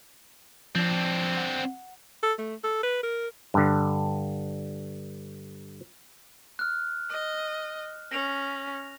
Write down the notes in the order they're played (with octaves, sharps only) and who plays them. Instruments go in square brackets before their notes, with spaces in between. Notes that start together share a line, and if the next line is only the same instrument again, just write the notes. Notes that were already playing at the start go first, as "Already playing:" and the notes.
[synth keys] F3 A6 [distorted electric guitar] C4 D4
[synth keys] F#5
[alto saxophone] A4
A3
A4
B4
A#4
[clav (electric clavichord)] G2 D3
[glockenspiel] F6 F#6
[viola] D#5
[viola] C#4 [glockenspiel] A#6 F7